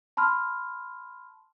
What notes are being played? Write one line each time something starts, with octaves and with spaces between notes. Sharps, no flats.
A5 B5 C6 F6